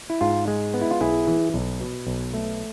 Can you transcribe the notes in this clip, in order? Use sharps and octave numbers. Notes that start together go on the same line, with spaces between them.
E4
G#2 F4
G#3
B3
E4
F4
B1 E4 G#4
E3
B1
B2
B1
A3